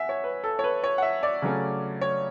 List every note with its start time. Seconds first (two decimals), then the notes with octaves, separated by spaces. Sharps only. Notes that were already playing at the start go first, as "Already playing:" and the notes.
Already playing: E5 F#5 G#5
0.09 C#5
0.24 B4
0.44 A4
0.59 C#5
0.64 B4
0.84 C#5
0.98 F#5
1.02 E5
1.23 D5
1.42 C#3 F#3 A3 C#4
2.01 C#5